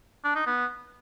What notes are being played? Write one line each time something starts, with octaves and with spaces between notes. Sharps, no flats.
D4
D#4
B3